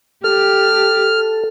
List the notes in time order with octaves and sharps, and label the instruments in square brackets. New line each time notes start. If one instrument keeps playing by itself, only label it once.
[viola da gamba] G4 [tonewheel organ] A4 [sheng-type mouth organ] F6